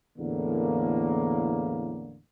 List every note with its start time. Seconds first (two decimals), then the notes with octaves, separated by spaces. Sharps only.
0.19 E2 A2 D3 A#3